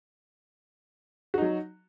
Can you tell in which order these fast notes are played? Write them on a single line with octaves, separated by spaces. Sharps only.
F#4 D#4 F#3